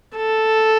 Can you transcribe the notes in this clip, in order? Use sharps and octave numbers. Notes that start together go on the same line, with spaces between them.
A4